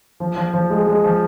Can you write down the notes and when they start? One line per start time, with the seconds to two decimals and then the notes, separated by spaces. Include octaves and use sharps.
0.20 F3
0.36 F3
0.54 F3
0.70 G#3
0.87 G#3
1.04 F3